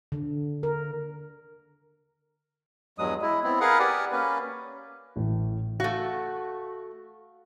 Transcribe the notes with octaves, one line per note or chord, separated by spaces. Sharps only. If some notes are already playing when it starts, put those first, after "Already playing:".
D3
A#4
E2 G2 F#3 G#3 D#6
G#3 E4
B3 C4 E4
G#4 A#4 B4 F5 F#5
G4 D5 F#5 G#5
A#3 C#4 B4
A1 A2
A3 F#4 F5